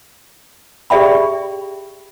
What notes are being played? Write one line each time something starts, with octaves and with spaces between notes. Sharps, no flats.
G4 G#4 D5 E5 G5 B5